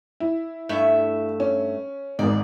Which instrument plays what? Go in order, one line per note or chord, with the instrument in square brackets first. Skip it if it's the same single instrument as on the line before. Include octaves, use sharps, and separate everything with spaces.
[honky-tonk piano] E4
[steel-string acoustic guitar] G2 A3 E5
[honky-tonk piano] C#4
[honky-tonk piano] G#1 G#2 [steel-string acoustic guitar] D5